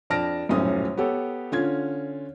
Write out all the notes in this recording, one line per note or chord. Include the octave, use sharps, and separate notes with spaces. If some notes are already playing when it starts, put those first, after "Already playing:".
F2 D4 A5 F6 A#6 D7
D#1 B1 F#2 A2 C#4 D#6
B3 G4 A4 C#5
D3 C#4 F4 G#6